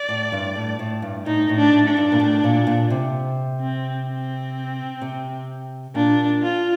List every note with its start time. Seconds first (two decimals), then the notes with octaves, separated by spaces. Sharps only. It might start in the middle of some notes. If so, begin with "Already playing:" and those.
Already playing: D5
0.09 A2
0.32 G2
0.56 A2
0.79 A2
1.02 G2
1.26 A2 D#4
1.49 A2
1.57 D4
1.73 A2
1.89 D4
1.97 G2
2.12 A#2
2.20 A2
2.44 A#2
2.67 A#2
2.90 C3
3.61 C4
4.08 C4
5.02 C3
5.95 A#2 D4
6.43 F4